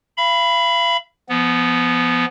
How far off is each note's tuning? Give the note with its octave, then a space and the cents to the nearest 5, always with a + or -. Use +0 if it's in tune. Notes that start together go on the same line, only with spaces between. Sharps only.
F5 -40 B5 +0
F3 -30 B3 +0